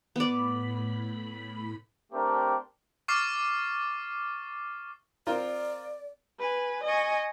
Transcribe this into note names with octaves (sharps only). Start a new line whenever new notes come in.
A2 B3 D5 B5
A3 C4 D4 G4 A#4
C#6 D6 F6 A6 C7
C4 F4 A#4 D5
B4 G#5
D#5 G#5 C#6